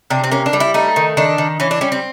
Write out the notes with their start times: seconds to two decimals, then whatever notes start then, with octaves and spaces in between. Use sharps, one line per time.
0.10 C3 D4
0.24 C4
0.31 A#3 C#4
0.46 D4
0.53 G3
0.60 E4
0.74 A3 D#4
0.96 D#3
1.17 D#3 D4
1.38 D#3
1.60 E3 C#4
1.71 D4
1.81 G3 C#4
1.92 C4